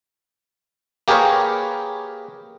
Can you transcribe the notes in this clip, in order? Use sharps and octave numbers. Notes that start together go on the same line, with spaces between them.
A#3 G4 G#4 A#4 B4 C#5